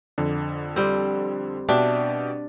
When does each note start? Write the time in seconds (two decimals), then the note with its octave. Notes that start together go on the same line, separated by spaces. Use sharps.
0.18 F2 D3
0.76 G3 C4
1.69 B2 D4 G4 E5